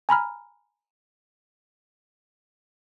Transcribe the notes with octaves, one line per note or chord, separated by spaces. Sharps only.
G#5 A#5 B5 F6